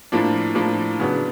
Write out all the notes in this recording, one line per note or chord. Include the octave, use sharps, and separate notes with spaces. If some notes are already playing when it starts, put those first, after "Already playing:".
A2 F3 A#3 D4
A2 F3 A#3 D4
C#3 F#3 B3 D4